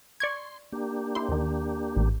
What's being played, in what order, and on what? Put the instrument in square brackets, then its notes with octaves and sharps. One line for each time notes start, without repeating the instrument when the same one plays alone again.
[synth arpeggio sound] D5 C#6 G#6 [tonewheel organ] C6
[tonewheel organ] A#3 D4 G4
[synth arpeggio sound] E4 C6
D#2 D#3
A1